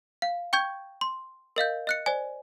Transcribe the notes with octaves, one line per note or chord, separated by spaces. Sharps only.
F5
G5 C#6 G6 G#6
C6
A#4 D#5 F5 G6
D#5 F#6 C#7
C5 D5 G#5